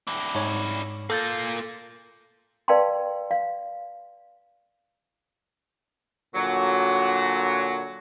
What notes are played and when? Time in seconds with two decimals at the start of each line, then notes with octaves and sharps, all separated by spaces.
0.07 D4 E4
0.35 G#2 C#5
1.10 A#3 F4 A4 G6 A6
2.68 B4 D5 F5 G5 A5 C6
3.31 F5
6.35 A#2 D3 F#3